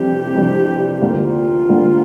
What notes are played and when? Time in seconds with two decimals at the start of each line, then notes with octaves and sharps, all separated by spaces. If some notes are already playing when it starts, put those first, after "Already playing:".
Already playing: F2 C3 E3 G3 D4 G4
0.35 F2 C3 E3 G3 D4
1.01 D2 D3 G3 A#3 F4
1.69 D2 D3 G3 A#3